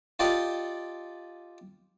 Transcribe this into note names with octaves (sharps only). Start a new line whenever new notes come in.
F4 G4 A4 D5 D#5